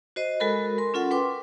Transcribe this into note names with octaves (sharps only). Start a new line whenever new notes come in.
F#4 C5 D#5
G#3 F#4 A4 A#4 B5
A#4 C6
C#4 F4 A4 F#5
B4 G5 C6 D6